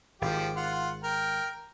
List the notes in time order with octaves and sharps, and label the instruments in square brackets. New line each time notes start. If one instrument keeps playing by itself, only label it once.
[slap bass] G#1 [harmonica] F3 G4 F5
[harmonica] F4 F#5
A#4 G5